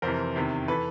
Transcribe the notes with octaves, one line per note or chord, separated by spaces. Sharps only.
F2 C3 E3 A#4 C5
E2 C3 D#3
E3 A4 B4